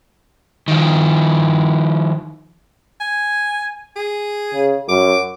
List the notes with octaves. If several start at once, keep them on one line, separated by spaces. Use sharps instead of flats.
D#3 F3
G#5
G#4
C#3
F#2 D6